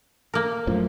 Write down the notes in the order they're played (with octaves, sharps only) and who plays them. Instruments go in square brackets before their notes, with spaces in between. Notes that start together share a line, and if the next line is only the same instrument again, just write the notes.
[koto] A#3 A#4
[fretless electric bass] F#2 A2 F3